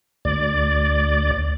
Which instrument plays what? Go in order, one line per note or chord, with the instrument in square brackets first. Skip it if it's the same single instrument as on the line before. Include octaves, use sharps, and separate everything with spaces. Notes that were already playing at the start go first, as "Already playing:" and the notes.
[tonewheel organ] D2 D5